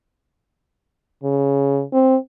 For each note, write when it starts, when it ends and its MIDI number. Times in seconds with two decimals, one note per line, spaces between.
1.23 1.83 49
1.93 2.16 60